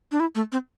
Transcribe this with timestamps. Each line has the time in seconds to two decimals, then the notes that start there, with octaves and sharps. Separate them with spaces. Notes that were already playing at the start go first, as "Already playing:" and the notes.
0.12 D4
0.20 E4
0.35 A3
0.52 C4